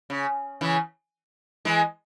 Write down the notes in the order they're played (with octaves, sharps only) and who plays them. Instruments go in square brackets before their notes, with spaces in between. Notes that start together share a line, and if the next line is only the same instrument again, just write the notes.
[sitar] C#3
C#3 E3
E3 G#3